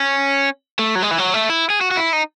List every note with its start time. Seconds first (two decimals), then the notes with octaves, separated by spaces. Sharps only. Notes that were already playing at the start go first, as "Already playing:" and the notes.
Already playing: C#4
0.79 A3
0.95 F#3
1.02 G#3
1.11 E3
1.18 F#3
1.34 A3
1.50 E4
1.70 G#4
1.81 F#4
1.91 F#4
1.97 E4
2.13 D#4